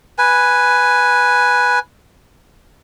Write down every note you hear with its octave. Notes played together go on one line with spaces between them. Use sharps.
B4 G#5